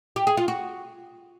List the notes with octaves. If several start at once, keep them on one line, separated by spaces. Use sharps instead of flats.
G4
G#4
F4
F#4